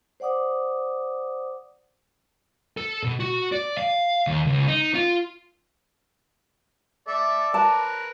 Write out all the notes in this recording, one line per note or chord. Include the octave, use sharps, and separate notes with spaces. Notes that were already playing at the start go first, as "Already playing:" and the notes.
C5 D5 F#5 D6 D#6
A4
B2
F#4
D5
F5
D#2
C#2
D#4
F4
A4 D5 E5
A#4 B4 A5